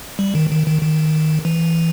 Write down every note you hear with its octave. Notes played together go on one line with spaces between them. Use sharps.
G3
D#3
D#3
D#3
D#3
E3